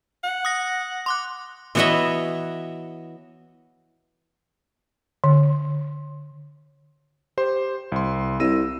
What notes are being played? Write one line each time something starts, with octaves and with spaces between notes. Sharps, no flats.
F#5
D#6 A#6
C6 D6 F#6
E3 B3 F#4 C#5 D#5 E5
D3
G4 C5 C6
C2 C6
C2 E6 A#6 D#7